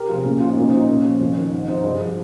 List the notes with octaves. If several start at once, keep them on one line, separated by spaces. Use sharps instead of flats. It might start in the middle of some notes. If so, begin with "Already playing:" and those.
Already playing: G4 A#4
C3 F3 F4 G#4
A#2 C#4
F3 F4
D#4
A#2 C#4
F3 C4 D#4
A#2 C#4 F4
F3
F2
D#3
G#2
F3 C4 D#4
G2 G#4 C5
F3